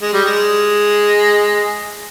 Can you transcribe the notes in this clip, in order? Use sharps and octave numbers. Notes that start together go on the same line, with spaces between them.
G#3
G3
G#3